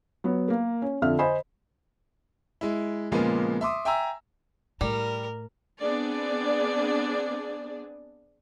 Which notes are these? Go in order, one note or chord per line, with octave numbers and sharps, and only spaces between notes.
F#3 B3
A#3 A#4
C#4
F2 D3 E5 F6
C5 D#5 G#5 B5
G#3 E4
A#2 C#3 F3 G#3 A#3 B3
E5 C6 D6 D#6
E5 G5 G#5 A#5 E6
A2 G3 A#4
B3 C4 D4 G#4 D5